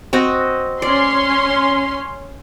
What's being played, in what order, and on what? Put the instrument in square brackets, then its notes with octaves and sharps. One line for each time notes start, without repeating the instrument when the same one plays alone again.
[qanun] C4 F#4 D#5
[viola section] C#4 C6 [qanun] D5